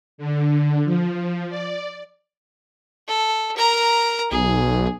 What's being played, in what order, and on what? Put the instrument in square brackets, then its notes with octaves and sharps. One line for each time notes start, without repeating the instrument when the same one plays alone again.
[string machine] D3
F3
D5
[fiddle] A4
A#4 A#5
[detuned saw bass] B1 [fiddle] G#4